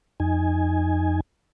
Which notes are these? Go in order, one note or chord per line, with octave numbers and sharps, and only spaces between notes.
F2 D#4 G#5